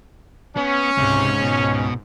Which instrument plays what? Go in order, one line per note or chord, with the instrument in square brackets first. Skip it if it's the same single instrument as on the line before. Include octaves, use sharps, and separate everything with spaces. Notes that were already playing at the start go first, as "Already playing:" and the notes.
[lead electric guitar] B3 [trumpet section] C#4
[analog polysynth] C#2 G#2 [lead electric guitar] C3
[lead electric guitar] B2